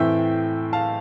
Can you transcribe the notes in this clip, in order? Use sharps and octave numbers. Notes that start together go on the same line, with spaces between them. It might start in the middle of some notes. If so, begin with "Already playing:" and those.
Already playing: A2 E3 A3 C4 E5 G5
F5 A5